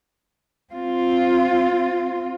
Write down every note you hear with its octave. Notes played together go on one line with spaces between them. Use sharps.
C4 F4